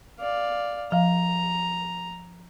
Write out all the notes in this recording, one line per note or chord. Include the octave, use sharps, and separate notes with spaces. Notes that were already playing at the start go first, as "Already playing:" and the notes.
D5 F5
F3 F5 A#5